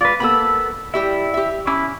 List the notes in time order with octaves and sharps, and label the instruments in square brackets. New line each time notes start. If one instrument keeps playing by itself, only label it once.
[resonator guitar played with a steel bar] G#3 F4 [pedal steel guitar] B4 D5
[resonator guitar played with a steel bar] A#3 B3 A4 [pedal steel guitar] B5 E6
[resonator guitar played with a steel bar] G3 G4 E5 [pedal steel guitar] E4
[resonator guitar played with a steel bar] G4 E5
[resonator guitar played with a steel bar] C#4 [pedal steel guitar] E4 B5 D6